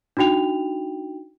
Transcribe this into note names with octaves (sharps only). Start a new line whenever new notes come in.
D4 D#4 F#4 G5 F7